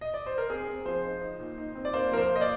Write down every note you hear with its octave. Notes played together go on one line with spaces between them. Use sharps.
D#5
D5
C5
A#4
C4 G#4
C4
F3 C5
D#4
D#4
A#2
D#4
C4
D5
A#3 C5
F3 A#4
C5
A#3
D#5
D5